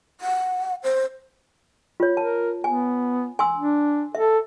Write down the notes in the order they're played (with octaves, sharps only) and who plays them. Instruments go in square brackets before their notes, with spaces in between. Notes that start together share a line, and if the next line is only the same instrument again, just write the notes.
[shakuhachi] F#5
C5
[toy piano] F4 C#5
[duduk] A#4 [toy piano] A5
[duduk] B3 [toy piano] G#5
[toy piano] G#5 C6 E6
[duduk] D4
[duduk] A4 [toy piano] E5